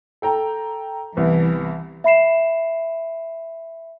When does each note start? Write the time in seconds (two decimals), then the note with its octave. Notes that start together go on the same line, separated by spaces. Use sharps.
0.22 A4 G5 A#5
1.17 C2 E3 B3
2.04 E5 B5 C7 E7